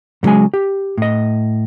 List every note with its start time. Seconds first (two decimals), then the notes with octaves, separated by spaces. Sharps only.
0.23 F#2 C#3 F#3 G#3 G#5
0.54 G4
0.98 A2 D#5